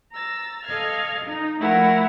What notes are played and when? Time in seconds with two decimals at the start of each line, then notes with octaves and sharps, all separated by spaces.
0.12 A#5 E6 A6
0.64 A4 D#5 F5 F6 G#6
1.24 D#4
1.59 F3 A3 A#3 E4 A#4 F#5